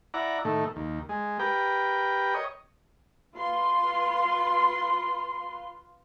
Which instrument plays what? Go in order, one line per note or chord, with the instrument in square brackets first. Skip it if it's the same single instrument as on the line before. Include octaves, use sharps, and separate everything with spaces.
[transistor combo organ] E4 D5 F#5 A#5
A2 D#3 A3
D#2
G#3
G4 A#4 B4 G5
C#5 D#5
[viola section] F4 B4 C6